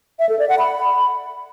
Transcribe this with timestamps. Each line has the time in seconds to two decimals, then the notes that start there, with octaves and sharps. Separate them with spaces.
0.19 E5
0.29 A4
0.39 D5
0.49 F#5
0.59 B5